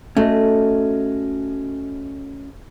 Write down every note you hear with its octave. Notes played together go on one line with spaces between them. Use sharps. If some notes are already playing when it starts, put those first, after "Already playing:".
A3 C#4 F#4 D#5